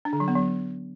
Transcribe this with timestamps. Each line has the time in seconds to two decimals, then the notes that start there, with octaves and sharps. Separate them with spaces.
0.05 D4
0.13 D3
0.20 F#3
0.28 B3
0.35 F#3